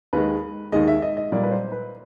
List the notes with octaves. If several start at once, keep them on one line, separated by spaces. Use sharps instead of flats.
D#2 D#3 G#3 B4
D#2 D#3 G#3 D#5
E5
D#5
D#5
A#2 G3 A#3 D5
B4
C5
B4